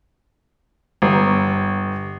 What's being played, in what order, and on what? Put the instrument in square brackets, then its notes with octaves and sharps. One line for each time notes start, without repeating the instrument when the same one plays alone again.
[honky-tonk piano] G1